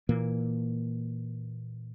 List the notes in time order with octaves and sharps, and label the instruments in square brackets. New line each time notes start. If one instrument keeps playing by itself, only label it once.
[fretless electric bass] A#2 E3 A#3